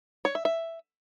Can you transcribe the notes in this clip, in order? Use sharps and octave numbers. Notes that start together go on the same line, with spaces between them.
C#5
E5
E5